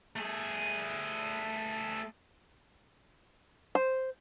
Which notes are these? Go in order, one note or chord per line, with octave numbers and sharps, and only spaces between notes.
A3 G#4
C5